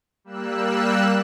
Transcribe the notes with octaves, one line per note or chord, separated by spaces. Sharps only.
G3 A#3 E6 F#6